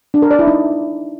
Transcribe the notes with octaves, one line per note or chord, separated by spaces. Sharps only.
D4
A#4
D5
E4
D#4